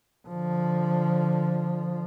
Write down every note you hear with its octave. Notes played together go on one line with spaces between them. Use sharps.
D3 F3